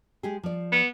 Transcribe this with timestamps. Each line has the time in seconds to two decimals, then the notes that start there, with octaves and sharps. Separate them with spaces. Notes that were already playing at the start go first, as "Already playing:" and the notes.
0.23 G#3 G4 G#4
0.43 F3 D5
0.72 B3